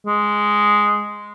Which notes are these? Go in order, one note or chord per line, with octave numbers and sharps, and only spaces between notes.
G#3